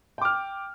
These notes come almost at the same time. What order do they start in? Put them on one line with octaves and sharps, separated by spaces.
G5 D6 F6